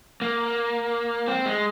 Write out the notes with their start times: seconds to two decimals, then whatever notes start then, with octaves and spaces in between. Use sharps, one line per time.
0.22 A#3
1.28 C4
1.46 G#3